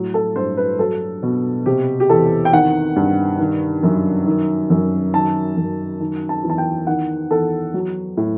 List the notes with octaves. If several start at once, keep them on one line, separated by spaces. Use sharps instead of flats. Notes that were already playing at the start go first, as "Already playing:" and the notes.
Already playing: A2 F#3
A4
G2 C5
B4
F#3 A4
B2
C3 G4
G4
E2 A4
G5
D#3 F#5
G2
D#3
F#2
D#3
F#2
D#3 A5
F#2
D#3
A5
E2
A5
G5
D#3 F#5
E2 A4
F#3
A2